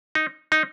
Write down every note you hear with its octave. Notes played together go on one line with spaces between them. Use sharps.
D#4
D#4